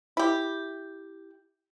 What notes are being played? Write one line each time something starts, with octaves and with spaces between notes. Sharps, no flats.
E4 G4